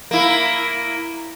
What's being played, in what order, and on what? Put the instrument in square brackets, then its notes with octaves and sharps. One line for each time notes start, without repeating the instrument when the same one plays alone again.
[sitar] A#3 E4